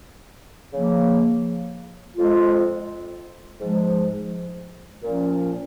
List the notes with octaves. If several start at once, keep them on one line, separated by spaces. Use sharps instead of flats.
C#3 F3 A#3
F2 F3 G#3 F4
G#2 F3 G#3
A#2 F3 C#4